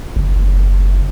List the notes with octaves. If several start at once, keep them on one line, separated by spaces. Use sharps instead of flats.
F#1